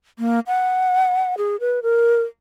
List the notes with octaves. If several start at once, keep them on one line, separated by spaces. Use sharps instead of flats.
A#3
F#5
G#4
B4
A#4